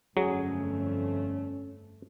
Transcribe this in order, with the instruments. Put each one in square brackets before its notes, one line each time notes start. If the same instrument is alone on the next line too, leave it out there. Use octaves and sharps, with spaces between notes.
[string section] G1 F2 A3 [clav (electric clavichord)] F#3 [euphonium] C#4 [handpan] G#4